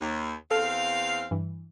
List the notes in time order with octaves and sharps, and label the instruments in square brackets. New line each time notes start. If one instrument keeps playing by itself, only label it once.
[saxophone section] D#2
[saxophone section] E2 C4 F5 [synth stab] A4
[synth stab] G2 E3